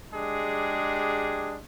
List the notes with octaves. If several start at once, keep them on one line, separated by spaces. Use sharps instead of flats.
G#3 D4 G4 G#4